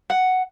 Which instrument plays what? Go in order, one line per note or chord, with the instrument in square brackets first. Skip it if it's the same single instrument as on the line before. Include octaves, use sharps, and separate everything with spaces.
[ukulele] F#5